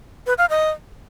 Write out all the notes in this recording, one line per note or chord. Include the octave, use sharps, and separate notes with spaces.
B4
F5
D#5